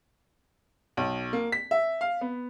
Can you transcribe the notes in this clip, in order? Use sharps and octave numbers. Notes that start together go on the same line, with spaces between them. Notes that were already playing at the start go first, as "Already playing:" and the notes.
B1
A#3
B6
E5
F5
B3